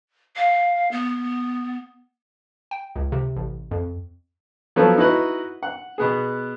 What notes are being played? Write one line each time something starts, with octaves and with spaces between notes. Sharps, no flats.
F5
B3
G5
C#2
C3
A1
F2
F3 F#3 B3 A4 B4 C#5
D#4 E4 F#4 B4 D#5
F#5
B2 B3 G#4